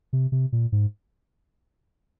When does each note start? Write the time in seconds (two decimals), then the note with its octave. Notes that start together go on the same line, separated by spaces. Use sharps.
0.13 C3
0.32 C3
0.52 A#2
0.72 G#2